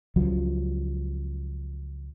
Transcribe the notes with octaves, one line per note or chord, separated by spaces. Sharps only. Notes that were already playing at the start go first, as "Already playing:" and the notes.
C#2 F3 F#3